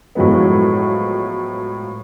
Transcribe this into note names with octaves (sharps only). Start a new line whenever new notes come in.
A2 F3 F#3 G#3 B3